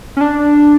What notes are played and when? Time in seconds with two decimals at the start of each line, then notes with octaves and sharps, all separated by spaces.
0.17 C#4
0.21 D4